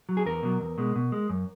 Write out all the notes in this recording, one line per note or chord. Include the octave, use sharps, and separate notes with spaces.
F#3
G#4
E2 A#4
B2 F#3
E2
B2 G#3
B2
G#3
F#2